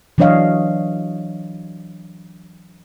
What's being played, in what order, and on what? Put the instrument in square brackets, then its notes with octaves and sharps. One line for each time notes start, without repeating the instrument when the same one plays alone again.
[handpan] E3 F#3 D4 C#5 D#5 F5